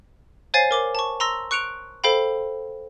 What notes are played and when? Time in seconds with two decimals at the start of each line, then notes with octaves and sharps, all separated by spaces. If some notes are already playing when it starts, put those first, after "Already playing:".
0.54 C5 C#5 F5 G#5 A6 C7
0.71 A#4 D6 G7
0.95 A5 C#6
1.20 A#5 C6 E6 A#6
1.51 C#6 F#6 C#7 D7 F7
2.04 A4 C5 F5 G5 B5